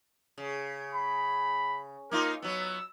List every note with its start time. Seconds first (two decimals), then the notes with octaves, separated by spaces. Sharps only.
0.38 C#3
0.94 B5
2.11 A#3 D#4 F4 A#4
2.42 F#3 B3 E6